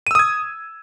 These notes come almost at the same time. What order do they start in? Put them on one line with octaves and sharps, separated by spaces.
D#7 E6 D#6 G#6